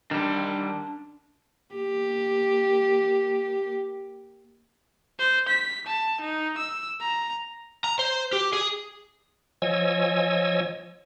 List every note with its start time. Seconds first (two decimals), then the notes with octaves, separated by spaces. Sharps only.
0.11 D#3 G3 D4 C6
1.75 A#3 G4
5.19 C5
5.48 B6
5.86 A5
6.21 D#4
6.58 E6
7.01 A#5
7.84 A#5
7.99 C5
8.33 G4
8.53 G#4
9.62 F3 C#5 D#5 G#5 E6